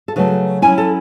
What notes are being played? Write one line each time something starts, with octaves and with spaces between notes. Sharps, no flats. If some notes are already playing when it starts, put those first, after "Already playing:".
A4
C#3 F#3 A3 B4
F#3 C#4 E4 G#5
A4